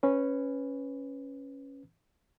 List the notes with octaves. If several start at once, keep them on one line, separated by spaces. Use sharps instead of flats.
C#4 B4